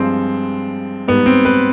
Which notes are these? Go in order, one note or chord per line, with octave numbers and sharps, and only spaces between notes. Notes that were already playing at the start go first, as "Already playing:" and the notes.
Already playing: G2 F3 G#3 C4
G#2 G3 B3
C4
B4